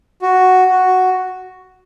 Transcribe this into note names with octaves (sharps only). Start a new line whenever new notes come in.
F#4
F#4